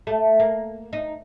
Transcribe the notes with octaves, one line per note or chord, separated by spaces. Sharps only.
A3
A#3
D#4